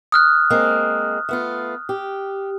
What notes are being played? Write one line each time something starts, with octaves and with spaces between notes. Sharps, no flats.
D#6 F6 F#6
G#3 A#3 C4
A3 B3 F4
G4